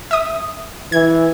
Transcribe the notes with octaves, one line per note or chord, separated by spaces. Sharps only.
E5 D#6
E3 G#6